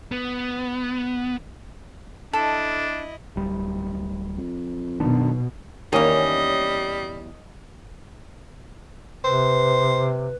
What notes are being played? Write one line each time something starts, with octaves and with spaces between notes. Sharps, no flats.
B3
D4 E4 A4 D#5
D1 G3
F2
F#1 B1 B2 D#3 D4
E2 D#3 G3 A#3 C#4 D#5
C3 B4 C5